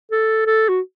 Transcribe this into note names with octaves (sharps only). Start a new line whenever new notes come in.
A4
A4
F#4